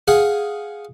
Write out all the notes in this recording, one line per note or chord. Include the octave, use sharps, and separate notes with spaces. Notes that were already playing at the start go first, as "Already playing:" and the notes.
G#4 F5 F#5